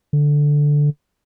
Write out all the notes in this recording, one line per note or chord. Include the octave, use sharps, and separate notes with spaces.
D3